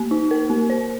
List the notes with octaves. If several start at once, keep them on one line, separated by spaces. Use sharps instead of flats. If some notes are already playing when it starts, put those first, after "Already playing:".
Already playing: A#3
D#4
A#4
A#3
C5